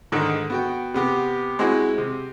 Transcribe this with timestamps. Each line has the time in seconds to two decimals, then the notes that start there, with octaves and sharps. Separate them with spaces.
0.12 G#2 D3 D#3
0.50 B3 F#4 G5
0.94 C3 B3 G4
1.59 G#3 C4 E4 F#4
1.98 C3